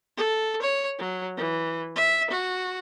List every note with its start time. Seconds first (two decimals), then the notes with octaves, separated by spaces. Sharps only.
0.17 A4
0.62 C#5
0.99 F#3
1.37 E3
1.96 E5
2.30 F#4